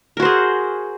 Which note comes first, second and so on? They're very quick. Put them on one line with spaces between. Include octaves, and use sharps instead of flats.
A#4 F#4 C5 G#4